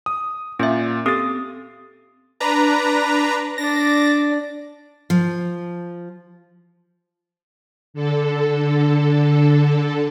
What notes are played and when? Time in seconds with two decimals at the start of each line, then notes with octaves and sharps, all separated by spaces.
0.06 D#6
0.59 A#2 C#4 E5
1.06 C4 G4 A4 D#6 A6
2.40 D4 B4 A#5
3.58 D4 D5 A#6
5.10 F3
7.94 D3 A4